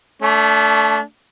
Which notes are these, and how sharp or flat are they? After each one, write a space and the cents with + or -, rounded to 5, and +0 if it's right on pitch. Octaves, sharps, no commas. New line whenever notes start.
A3 +0 D4 -30